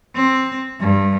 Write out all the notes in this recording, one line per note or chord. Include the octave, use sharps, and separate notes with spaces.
C4
G2